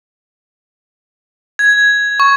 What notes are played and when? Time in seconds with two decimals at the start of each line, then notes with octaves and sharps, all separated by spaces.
1.59 G#6
2.20 C#6